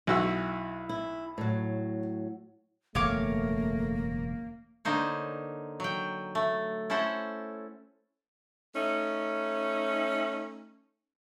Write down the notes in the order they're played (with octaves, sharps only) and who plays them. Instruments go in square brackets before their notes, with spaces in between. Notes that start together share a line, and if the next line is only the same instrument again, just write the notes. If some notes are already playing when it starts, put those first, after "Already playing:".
[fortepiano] B1 F#4 E6 [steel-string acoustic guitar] E4
[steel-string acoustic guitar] E4
A2 F#3
[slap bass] E1 F#2 C#3 [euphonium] A3 [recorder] A#3 [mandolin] C#5 F5 D6
[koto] D3 A#3 D#4 C5 C#5
F#3 G5
A3
C#4 E4 A4 C5 F#5
[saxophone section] A3 C#4 D#4